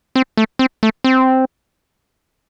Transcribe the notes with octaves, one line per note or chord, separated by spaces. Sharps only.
C4
A3
C4
A3
C4